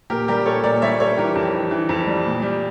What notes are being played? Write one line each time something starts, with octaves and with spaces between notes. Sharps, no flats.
A#2 G4 A#4
G3 G4 A#4
A#2 A4 C#5
A#2 A#4 D5
G3 C#5 E5
G3 A4 C#5
E3 G4 A#4
F2
E3
E3
F2
G3
A#2
G3